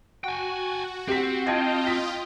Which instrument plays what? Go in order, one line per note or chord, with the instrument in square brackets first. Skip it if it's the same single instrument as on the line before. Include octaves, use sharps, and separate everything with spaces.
[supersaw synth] F#4 [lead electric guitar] G5 G#5
[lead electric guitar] C4 [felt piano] G4 B6
[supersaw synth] F4 D#5 G5 [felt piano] A5 G#6 C7
[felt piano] B6